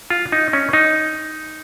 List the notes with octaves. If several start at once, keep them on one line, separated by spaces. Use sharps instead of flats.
F4
D#4
C#4
D#4